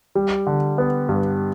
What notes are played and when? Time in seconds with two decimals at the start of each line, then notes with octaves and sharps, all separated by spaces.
0.15 G3
0.47 D3
0.78 B3
1.09 G2